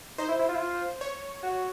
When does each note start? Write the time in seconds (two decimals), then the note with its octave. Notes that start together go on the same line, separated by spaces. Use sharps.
0.18 D#4 C5
0.29 E4
0.39 E4
0.49 F4
0.55 E4
0.60 F4
1.01 C#5
1.43 F#4